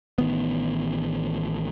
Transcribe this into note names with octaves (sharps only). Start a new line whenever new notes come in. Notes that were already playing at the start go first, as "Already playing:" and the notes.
A1 D#3 B3